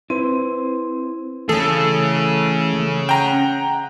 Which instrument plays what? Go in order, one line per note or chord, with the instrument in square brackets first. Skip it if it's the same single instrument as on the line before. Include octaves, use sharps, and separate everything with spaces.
[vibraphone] C4 [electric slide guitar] E4 B4 C5
[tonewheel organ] E3 A3 [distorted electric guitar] C#4 G#4 [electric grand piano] A4
[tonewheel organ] F#5 [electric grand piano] G5 A#5